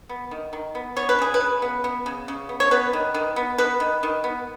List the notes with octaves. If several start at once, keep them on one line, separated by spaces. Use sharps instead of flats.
B3
D#3
D#3
B3
B3 C#5
B4
C#3 G#4
B4
C#3
B3
B3
C#3
C#3
B3
C#5
B3 B4
D#3
D#3
B3
B3 B4
D#3
D#3
B3